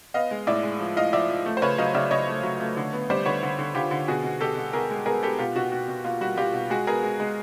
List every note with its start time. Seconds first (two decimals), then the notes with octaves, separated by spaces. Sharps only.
0.14 B3 D#5 F5
0.31 G#3
0.47 A2 D5 E5
0.63 G#3
0.80 F3
0.96 A2 D#5 F5
1.12 F3 D5 E5
1.29 F3
1.46 A3
1.57 C5
1.62 C#3 B4 C#5
1.78 F#3 D#5 F5
1.94 C#3 D5 E5
2.11 C#3 C#5 D#5
2.27 A3
2.43 F#3
2.60 A3
2.77 D3
2.93 B3
3.10 G3 C5 D5
3.26 D3 B4 C#5
3.43 D3
3.59 D3
3.75 D3 F4 G4
3.91 D3
4.08 B2 F#4 G#4
4.24 B2
4.41 B2 G4 A4
4.57 B2
4.73 B2 G#4 A#4
4.91 G#3
5.06 B3 G#4 A#4
5.23 B3 G4 A4
5.39 B2 F4 G4
5.56 B2 F#4
5.72 B2 F#4
5.88 B2
6.05 A#3 F4
6.21 G3 F#4
6.37 G3 F4 G4
6.54 B2
6.70 G#3 F#4 G#4
6.87 B3 G#4 A#4
7.03 G#3
7.20 G#3